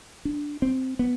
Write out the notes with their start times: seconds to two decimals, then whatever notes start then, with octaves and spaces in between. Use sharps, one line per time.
0.25 D4
0.62 C4
0.99 B3